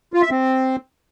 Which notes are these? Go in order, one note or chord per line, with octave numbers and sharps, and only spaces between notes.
F4
E5
C4